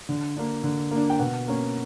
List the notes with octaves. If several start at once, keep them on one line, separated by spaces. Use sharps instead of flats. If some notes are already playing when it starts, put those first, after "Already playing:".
D3
A#3 D4
D3
A#3 D4
G5
B2 F#5
A#3 C#4